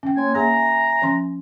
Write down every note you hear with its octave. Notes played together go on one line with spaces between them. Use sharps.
C#4 G5
A#3 C#5 G#5 C6
A#3 G#4 E5 G#5 A#5
F3 C#4 C6